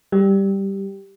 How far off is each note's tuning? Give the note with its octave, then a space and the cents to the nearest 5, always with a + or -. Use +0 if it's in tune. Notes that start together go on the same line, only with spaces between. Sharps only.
G3 +0 G4 +0